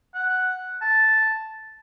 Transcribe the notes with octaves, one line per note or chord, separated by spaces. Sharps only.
F#5
A5